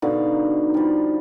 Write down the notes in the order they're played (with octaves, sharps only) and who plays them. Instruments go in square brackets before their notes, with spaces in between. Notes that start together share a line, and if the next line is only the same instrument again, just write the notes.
[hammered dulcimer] B2 D3 F5 [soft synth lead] D#4
[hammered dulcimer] F3 G3